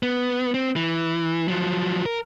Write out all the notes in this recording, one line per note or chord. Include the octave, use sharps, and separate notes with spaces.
B3
C4
E3
F3 F#3
A#4